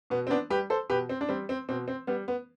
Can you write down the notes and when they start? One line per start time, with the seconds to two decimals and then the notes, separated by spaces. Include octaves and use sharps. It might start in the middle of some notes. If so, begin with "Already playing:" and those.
0.10 B2 B3
0.27 C4
0.30 B3 D4
0.50 G3 G4 B4
0.70 A4 C5
0.90 B2 G4 B4
1.09 C4
1.21 D4
1.29 G3 C4
1.49 C4
1.69 B2 C4
1.88 C4
2.07 G3 B3
2.28 B3